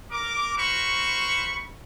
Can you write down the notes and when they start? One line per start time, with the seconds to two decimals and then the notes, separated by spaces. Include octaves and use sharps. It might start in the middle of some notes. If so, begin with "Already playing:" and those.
0.11 A#4 D6
0.57 F#4 A#4 C5 B5 C#6